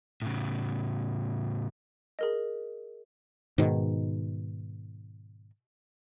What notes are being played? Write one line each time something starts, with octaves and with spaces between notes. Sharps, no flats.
A2 C#3
G#4 A#4 D#5
G#2 B2 D#3